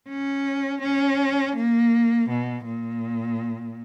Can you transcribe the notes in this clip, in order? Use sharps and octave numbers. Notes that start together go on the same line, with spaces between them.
C#4
C#4
A#3
B2
A#2